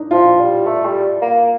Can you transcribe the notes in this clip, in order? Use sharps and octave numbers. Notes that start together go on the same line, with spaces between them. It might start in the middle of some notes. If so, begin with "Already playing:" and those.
Already playing: D4 D#4
F3 F4
G3
A3
G3
A#3